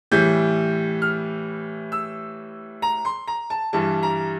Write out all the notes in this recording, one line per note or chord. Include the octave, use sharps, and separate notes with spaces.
A2 E3 G3 G6
F6
E6
A#5
C6
A#5
A5
G2 E3 G3 A5
A#5